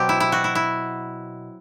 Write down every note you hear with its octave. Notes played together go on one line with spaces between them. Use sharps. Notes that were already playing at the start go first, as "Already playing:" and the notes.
Already playing: B2 F#3 C4 G4
E4
E4
F#4
E4
E4